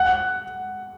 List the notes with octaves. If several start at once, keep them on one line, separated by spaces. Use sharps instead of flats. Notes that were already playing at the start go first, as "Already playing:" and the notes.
Already playing: F#5 F#6